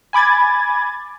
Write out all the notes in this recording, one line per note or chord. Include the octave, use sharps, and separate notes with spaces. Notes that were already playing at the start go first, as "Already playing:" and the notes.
G#5 B5 D6 G#6 A6